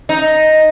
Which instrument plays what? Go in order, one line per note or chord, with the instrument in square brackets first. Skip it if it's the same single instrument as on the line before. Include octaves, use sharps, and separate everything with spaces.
[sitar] D#4